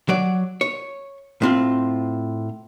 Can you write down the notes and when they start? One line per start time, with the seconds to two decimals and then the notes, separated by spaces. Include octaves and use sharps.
0.09 F#3 D5
0.61 C#5
1.42 A2 C4 F4